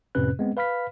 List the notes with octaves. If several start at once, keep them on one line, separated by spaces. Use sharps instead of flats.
F2 A2 C3 C#4 B4 F#6
G#3 B3 C4
B4 F5 B5 F6 B6